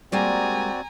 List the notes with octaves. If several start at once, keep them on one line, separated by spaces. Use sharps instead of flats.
G3 G#3 A#3 C4 F#4 D5 G#5 A#5